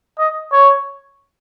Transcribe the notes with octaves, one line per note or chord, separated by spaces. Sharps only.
D#5
C#5